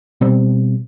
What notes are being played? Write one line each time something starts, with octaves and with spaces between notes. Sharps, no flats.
B2 G3 C4